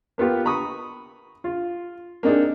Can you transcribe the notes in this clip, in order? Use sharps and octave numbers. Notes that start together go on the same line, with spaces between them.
A#3 B3 F4 G4
A#5 B5 C#6 D#6
F4
A#3 C4 D4 D#4 G#4